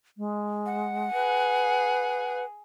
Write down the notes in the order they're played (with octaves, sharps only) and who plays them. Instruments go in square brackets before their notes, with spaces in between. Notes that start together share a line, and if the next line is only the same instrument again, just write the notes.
[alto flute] G#3
[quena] F#5
[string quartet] G#4 [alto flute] B4